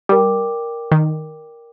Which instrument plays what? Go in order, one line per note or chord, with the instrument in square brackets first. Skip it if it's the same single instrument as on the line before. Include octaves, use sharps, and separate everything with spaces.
[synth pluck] G3 [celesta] A#4 D5 G5 D6
[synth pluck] D#3